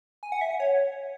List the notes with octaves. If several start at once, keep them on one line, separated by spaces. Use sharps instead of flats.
G#5
F#5
E5
F#5
C#5